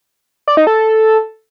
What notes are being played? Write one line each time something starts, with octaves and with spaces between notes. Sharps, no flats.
D5
D#4
A4